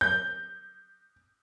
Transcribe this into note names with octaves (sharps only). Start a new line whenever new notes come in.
G6